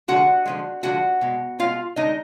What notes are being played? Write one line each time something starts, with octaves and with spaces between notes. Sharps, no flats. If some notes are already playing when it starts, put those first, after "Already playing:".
D3 F3 G#3 F#4 F#5
D3 F3 G#3
D3 F3 G#3 F#4 F#5
B2 G#3
B2 G#3 F4 F5
D3 G#3 D#4 D#5